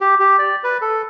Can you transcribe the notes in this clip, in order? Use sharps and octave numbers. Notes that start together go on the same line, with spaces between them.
G4
G4
D5
B4
A4